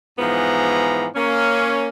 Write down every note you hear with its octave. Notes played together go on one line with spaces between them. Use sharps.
G#2 E3 F3 B3 A#5
A#3 C#4